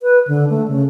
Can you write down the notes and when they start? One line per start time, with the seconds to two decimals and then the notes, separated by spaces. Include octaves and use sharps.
0.01 B4
0.27 D3
0.50 A3
0.68 C#3